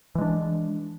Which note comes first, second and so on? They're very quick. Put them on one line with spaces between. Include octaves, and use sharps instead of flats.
E3 G#3 D4